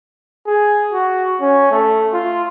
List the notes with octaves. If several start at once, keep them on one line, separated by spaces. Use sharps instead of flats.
G#4
F#4
C#4
A3
F4